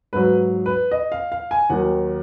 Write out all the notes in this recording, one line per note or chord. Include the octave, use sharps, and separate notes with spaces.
G#2 F#3 B4
B4
D#5
F5
F5
G#5
D#2 D#3 F#3 F#5